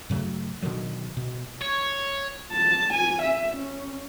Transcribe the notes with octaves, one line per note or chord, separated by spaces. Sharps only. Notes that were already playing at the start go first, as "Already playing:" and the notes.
G2 C#3 F#3 A3
B2 D3 D#3 F#3
B2
C#5
A5
G#5
E5
C#4